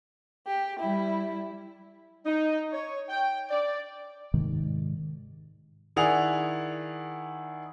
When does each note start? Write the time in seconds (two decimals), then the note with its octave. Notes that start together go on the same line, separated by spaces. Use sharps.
0.47 G4
0.80 G3 E4
2.26 D#4
2.73 C#5
3.09 G5
3.51 D5
4.34 G#2 C3 D#3 G#3
5.96 D#3 E4 G#4 D5 F#5 F7